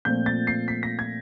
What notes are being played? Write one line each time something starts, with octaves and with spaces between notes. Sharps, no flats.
A#2 F3 A3 C4 G6
A6
C7
B6
A#6
G#6